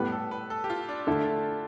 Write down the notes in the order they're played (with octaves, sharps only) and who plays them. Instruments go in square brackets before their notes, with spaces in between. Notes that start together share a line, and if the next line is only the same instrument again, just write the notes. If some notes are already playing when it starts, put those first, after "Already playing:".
Already playing: [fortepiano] A2 G3 B3 [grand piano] B4
[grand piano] A4
B4
A4
G4
F4
D4
[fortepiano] D3 A3 E4 A4